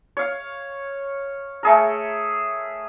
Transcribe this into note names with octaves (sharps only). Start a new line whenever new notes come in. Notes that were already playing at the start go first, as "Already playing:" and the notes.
C#5 F5
A3 G#4 A#4